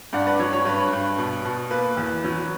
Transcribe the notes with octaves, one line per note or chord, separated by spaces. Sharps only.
G2 D5 F#5
B4 D5
F#3 C#5
C#5
G2 B4
G2
B2
B2
A#3 B4
E2
F#3